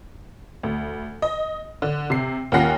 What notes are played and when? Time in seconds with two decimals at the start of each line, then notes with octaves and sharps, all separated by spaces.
0.63 D2
1.22 D#5
1.82 D3
2.10 C3 C7
2.52 D#2 C#4 F4 F#5 A#6 C7